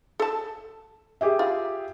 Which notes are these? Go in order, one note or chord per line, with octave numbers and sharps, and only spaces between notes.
A4 A5
G4 G#4 E5
F4